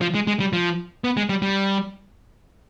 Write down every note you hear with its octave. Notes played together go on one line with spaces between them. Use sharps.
F3
G#3
G#3
G3
F3
B3
G#3
G3
G3